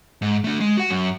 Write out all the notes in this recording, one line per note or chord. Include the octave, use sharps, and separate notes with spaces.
G#2
A3 D4
G#3
F#4 F#5
F#2